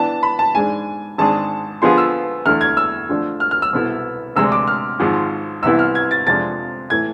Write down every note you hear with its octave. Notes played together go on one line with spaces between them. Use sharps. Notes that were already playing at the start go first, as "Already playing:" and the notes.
Already playing: E3 B3 D4 A5
B5
A5
G#2 G#3 D4 G#4 G#5
G#1 G#2 G#3 D4 G#4 A5
D3 F3 B3 F4 G#4 C6
E6
E2 D3 A3 E4 F6
G#6
E6
D3 F3 A3 D4
F6
F6
E6
C2 B2 B3 E4 A4
D2 C3 G#3 D4 E6
D6
F6
G#1 G#2 F3
C2 C3 E3 B3 E4 E6
F6
G#6
A6
F2 C3 F3 G#3 D4 A6
A2 E3 G#6